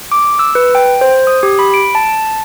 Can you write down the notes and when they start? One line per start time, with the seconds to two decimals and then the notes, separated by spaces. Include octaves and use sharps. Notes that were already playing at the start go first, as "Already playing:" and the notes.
0.12 D6
0.39 E6
0.55 B4
0.75 G5
1.01 C5
1.27 D#6
1.43 G4
1.59 B5
1.74 D7
1.95 A5